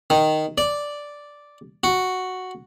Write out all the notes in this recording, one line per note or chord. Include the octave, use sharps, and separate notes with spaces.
D#3
D5
F#4